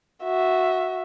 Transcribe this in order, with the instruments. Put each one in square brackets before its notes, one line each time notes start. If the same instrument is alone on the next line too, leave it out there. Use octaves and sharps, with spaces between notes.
[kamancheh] F#4 E5